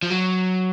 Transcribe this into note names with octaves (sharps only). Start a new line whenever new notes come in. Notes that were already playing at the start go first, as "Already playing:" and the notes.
F3
F#3